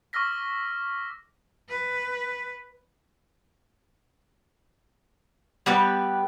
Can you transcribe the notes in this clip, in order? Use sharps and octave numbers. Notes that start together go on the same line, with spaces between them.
C#6 D6 E6 F6 A#6 B6
B4
G3 B3 G4 B4